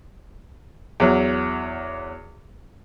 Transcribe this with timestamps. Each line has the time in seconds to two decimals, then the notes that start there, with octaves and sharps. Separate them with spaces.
1.00 E2 F#3